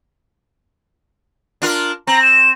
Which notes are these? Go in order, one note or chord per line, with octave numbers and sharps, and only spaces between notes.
D4 F4 A#4
C4 A#5
E7